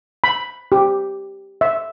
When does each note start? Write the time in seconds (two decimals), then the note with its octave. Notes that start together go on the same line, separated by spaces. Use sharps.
0.24 B5
0.72 G4
1.61 E5